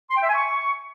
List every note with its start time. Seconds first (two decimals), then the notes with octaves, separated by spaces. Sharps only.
0.11 C6
0.17 G5
0.23 E5
0.29 G#5
0.35 C#6